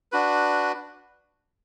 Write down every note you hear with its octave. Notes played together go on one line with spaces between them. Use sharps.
D4 F#4 B4